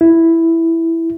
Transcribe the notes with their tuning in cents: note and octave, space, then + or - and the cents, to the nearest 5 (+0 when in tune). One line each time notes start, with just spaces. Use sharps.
E4 +0